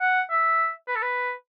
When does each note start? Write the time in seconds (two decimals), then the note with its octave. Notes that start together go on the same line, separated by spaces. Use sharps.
0.01 F#5
0.31 E5
0.88 B4
0.96 A4
1.02 B4